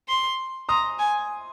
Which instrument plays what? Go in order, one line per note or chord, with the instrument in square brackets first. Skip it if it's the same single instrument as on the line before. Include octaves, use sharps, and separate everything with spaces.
[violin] C6
[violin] A#5 [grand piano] C6 D#6
[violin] G#5